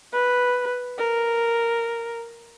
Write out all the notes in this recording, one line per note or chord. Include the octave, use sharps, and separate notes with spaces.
B4
A#4